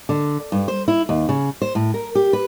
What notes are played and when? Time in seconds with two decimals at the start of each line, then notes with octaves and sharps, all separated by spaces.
0.09 D3
0.52 G2
0.68 C5
0.88 E4
1.09 D#2
1.29 C#3
1.62 C5
1.75 A2
1.94 A#4
2.15 G4
2.33 B4